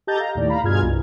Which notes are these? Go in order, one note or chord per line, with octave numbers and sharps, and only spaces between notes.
G4 A4 D#5 A#5 G6 A6
F5 A#5
D#2 A2 D5
F5 A#5 B5
G2 B2 F4 G#4 F6 G#6
C2